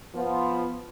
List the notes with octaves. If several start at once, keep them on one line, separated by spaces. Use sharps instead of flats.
F3 B3